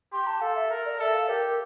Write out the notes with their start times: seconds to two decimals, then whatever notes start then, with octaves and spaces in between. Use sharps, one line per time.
0.12 G4 C6
0.27 A5
0.41 A4 F5
0.56 E5
0.71 A#4
0.86 D5
1.00 A4 E5
1.14 F5
1.29 G4 A#4